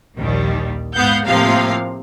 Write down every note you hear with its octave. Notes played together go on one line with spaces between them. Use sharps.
A#1 D#2 D#3 G3
G#2 B3 F5 F#5 G6
A2 C3 F3 A#3 F5